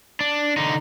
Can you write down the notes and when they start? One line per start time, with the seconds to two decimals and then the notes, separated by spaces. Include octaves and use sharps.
0.21 D4
0.57 D3 D#4